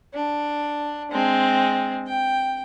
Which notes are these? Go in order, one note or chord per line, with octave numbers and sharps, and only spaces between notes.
D4
G#3 C4
G5